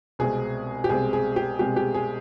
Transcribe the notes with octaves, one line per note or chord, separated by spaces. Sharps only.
C2 B2 G#3 C4 G#4
G4
C2 B2 G#3 C4 G#4
G#4
G4
C2 B2 G#3 C4 G4
G4
G#4